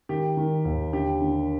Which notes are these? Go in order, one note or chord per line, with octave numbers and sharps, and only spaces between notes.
D#3 G4
D#3
D#2
D3 G4
D3